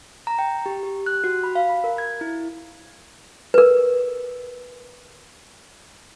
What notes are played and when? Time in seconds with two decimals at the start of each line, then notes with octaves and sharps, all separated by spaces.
0.27 A#5
0.39 G5
0.66 G4
0.83 G4
1.06 F#6
1.24 F#4
1.44 B5
1.55 F5
1.69 B5
1.84 A#4
1.98 G#6
2.21 E4
3.54 A#4 B4